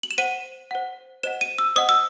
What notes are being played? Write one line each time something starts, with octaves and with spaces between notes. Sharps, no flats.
F#7
E7
C5 F#5 D#7
C5 F#5
C5 D#5 F#5 E7
D#7
E6
C5 D#5 F#5 D#6
E6